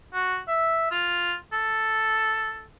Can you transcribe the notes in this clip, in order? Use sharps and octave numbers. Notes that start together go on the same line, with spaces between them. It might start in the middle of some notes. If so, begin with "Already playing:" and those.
F#4
E5
F4
A4